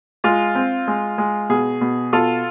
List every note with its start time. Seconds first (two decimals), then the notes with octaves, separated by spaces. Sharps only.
0.24 G#3 F4
0.55 C4
0.87 G#3
1.18 G#3
1.49 B2 G#4
1.81 B2
2.13 B2 F4 A4